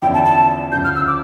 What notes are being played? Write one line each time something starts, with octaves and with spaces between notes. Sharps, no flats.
E2 D3 F3 C#4 E4 G5
A5
A5
D2 C#3 F3 G6
F6
E6
D6